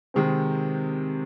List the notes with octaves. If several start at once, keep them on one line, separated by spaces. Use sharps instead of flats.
C3 D#3 G#3 C4